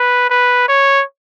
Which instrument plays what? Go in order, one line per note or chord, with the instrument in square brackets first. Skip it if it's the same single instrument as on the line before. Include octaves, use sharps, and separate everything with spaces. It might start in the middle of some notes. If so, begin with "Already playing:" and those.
Already playing: [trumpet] B4
B4
C#5